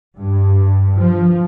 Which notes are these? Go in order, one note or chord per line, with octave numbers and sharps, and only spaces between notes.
G2
F3